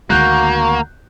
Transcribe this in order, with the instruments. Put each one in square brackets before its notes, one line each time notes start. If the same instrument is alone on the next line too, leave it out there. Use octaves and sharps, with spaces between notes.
[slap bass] D2 D#3 G#3 [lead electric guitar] A#3 [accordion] F#4 [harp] F#6 G6